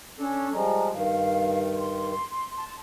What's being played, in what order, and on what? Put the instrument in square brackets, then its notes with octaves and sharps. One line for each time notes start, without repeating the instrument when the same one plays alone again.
[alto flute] C#4 [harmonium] D4 A4
[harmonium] F3 G3 G#3 [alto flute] A#5
[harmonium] G2 D#3 [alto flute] F5
[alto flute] C6
[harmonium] A5